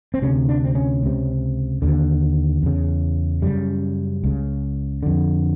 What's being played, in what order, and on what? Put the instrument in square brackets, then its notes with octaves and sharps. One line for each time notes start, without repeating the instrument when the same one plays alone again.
[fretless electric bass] C4
D2 C3 C#4
D4
C4
C#4
C#2 C3
D#2 D3
E2 C#3
F#2 C#3 G3
C#2 C#3
F2 D3